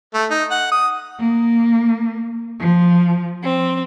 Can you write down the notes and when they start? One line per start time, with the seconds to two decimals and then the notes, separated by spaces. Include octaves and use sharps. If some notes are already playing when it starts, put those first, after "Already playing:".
0.14 A3
0.30 D#4
0.51 F#5
0.72 D#6
1.20 A#3
2.60 F3
3.42 C4